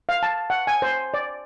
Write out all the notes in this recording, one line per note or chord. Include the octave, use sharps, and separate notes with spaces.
F5
A5
F#5
G#5
C5
D5